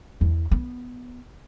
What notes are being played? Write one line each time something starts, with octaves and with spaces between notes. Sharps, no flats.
E2
B3